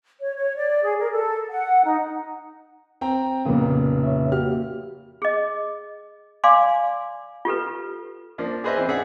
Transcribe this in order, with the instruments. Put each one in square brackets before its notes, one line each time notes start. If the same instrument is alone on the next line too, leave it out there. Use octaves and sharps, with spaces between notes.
[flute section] C#5
C#5
D5
G#4
A#4
A4
F#5
D#4
[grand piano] C4 G5 A#5
[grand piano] F1 A#2 C#3 [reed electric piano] F3 A#3 B3
[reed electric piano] C#5 E5
[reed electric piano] A#3 F#4 G4 [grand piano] F6
[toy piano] G#4 D#5
D5 F5 G#5 C6 D6
F4 G4 A4 B4
[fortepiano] F3 A#3 D4
G#4 B4 C5 D#5 E5
E3 C4
D4 G#4 E5 F#5